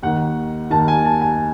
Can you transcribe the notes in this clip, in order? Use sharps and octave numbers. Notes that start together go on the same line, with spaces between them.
D#2 D#3 F#5
D#2 D#3 A5
G#5
A5
G#5